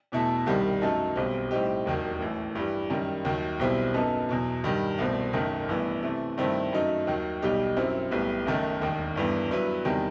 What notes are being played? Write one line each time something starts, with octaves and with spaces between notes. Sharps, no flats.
E2 B2 A3 E4 A4
C2 C3 D#3 G3
F#2 F#3 A3 D#4 A4
B1 B2 G3 C4
A2 G3 C4 D#4 G4
E1 D#2 D#3 F#3
A1 A2 E3
G2 E3 G3
F#2 D#3 G3
D#2 D#3 F#3
B1 B2 G3 C4 E4
F#2 F#3 B3 D#4 A4
E2 B2 F#3
G2 D#3 G3
C2 B2 A3 C4
F#1 F#2 D#3 A3
A1 G2 E3 B3
C3 E3 A3
G2 D#3 A3 C4 E4
F#2 F#3 A3 D#4
D#2 D#3 F#3
B1 B2 G3 D#4 G4
F#2 F#3 C4 E4
B1 A2 G3 B3
F#1 F#2 D#3 A3 D#4
E1 D#2 D#3
G1 G2 E3 B3
G2 F#3 B3 E4 B4
E2 C3 D#3 G3